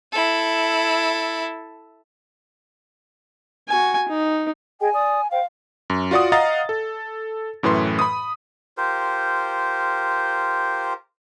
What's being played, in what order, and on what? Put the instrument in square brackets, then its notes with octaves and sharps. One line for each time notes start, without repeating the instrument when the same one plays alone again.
[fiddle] E4 A4
[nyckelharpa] F#4 G#5
D#4
[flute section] G#4 D#5 G5 [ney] G#5
[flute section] D5 D#6
[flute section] C5 G5 [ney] F5
[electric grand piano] F#2
F4 F#4 D5 F#5 D#6
D#5 F5 F#5 A#5 D#6 A6
A4
F#2 A2 E3 B4 C6
B5 D#6
[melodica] F4 G4 A#4 C5